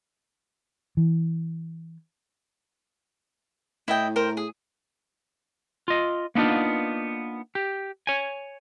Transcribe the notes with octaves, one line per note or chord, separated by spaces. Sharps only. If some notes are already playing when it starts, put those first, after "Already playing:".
E3
A2 E4 D#5 G5
A#4 C5 G5
G#4
F4 D#5
A#3 B3 D4 D#4 F4
G4
C#5 G#5